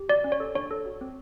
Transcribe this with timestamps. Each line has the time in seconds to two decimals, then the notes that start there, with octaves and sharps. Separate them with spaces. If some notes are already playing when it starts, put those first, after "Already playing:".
Already playing: G4
0.09 F#4 D5
0.24 C#4
0.32 C#5
0.40 A4
0.55 D4 C#5
0.71 A4
0.86 F#4
1.01 C4